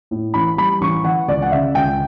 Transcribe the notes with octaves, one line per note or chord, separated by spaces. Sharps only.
A2
A1 B5
G3 B5
A1 C#6
E3 F#5
C#2 D5
F#5
C#3 E5
C#2 G5